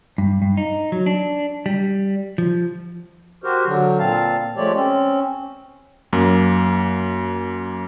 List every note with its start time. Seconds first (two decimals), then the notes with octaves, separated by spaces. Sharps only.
0.18 G2
0.42 G2
0.57 D#4
0.92 F#3
1.06 D4
1.66 G3
2.38 F3
3.44 F#4 G4 A#4 C5
3.67 D3 F#3
3.99 A#2 C4 F5 A5
4.57 F3 G#3 A3 G4 C#5 D5
4.75 C4 C#4
6.13 F#2 A#3